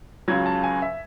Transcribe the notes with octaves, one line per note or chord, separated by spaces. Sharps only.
C#2 C#3 F#3 G#6
A5
G#5
E5